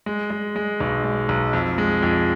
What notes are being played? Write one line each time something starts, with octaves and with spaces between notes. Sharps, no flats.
G#3
G#3
G#3
B1
G#3
B1
F2
G#3
F2